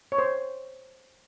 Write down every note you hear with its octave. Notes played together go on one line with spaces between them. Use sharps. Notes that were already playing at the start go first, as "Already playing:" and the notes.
C#5
C5